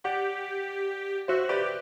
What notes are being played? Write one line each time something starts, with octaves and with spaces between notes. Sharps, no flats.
G4 D5 F#5
F#4 C5 E5
G4 B4 D5